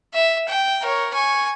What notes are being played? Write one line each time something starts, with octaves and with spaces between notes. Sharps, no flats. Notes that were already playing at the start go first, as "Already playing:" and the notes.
E5
G5
A#4 C#5
G#5 C#6